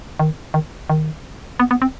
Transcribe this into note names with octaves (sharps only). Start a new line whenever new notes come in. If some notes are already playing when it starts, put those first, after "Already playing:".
D#3
D#3
D#3
B3
B3
C4